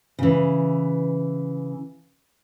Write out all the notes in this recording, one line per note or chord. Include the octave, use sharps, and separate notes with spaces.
C#3 E3